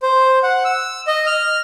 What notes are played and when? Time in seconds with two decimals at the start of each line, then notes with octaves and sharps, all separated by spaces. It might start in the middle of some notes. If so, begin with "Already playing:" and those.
0.03 C5
0.43 F#5
0.65 E6
1.07 D#5
1.26 F6